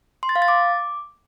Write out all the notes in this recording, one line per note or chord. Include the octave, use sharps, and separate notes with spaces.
C6
A6
F5
A6
D6